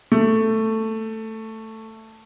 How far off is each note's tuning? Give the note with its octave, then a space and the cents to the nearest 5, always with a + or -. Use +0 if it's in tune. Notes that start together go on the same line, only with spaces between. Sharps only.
A3 +10